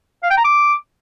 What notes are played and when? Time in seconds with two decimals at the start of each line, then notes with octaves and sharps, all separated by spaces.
0.23 F5
0.30 G5
0.37 A#5
0.44 D6